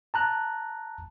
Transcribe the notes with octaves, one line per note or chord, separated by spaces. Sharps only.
A5 A#5 F#6